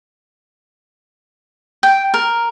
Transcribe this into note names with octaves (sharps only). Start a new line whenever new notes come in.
G5
A#4